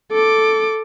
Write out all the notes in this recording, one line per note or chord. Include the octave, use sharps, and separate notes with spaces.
A4 D6